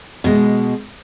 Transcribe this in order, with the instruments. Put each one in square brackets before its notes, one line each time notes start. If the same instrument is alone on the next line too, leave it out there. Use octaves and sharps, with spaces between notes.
[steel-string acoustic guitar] B2 G#3